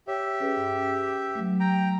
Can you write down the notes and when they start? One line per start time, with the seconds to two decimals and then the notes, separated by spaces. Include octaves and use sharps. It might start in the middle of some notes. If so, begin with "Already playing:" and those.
0.08 G4 C#5 E5
0.40 C#4 G#4 B4
0.57 G2
1.35 F#3 A3
1.60 G5 A#5